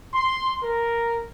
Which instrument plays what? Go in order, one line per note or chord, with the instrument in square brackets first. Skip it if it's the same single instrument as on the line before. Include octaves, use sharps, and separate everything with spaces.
[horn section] C6
A#4